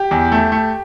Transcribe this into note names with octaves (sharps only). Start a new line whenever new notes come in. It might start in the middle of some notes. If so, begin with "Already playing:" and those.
Already playing: G4
E2
A3
A3